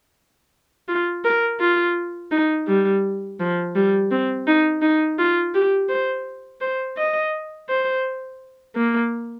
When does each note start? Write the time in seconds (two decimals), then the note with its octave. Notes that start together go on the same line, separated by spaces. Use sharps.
0.88 F4
1.24 A#4
1.60 F4
2.31 D#4
2.67 G3
3.40 F3
3.76 G3
4.11 C4
4.47 D#4
4.82 D#4
5.19 F4
5.55 G4
5.89 C5
6.61 C5
6.97 D#5
7.69 C5
8.76 A#3